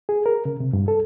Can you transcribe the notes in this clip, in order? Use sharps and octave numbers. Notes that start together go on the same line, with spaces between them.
G#4
A#4
C#3
C3
G2
A4